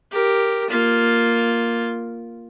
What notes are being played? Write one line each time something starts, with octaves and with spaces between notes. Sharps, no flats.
G4 A#4
A#3 F4